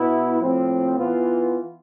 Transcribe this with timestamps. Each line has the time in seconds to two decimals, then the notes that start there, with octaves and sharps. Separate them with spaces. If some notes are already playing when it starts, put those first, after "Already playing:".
Already playing: B2 B3 E4
0.40 A2 F3 C4
0.98 E3 B3 F4